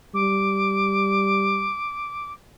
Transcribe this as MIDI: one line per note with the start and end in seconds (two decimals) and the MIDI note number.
0.14 1.73 55
0.14 2.32 86